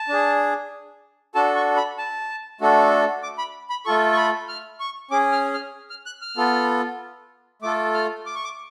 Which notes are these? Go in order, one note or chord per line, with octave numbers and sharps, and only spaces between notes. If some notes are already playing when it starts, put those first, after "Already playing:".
Already playing: A5
D4 G#4
D4 F#4 A4 A5
C#6
B5
A5
A3 D4 F#4 A4
D6
B5
B5
A3 F4 A4 C#6
C#6
B5
F6
C#6
C#4 G#4 D6
F6
F6
F6
F#6
F6
B3 F4 A4
A3 F4 A4 D6
F6
D6
C#6
D6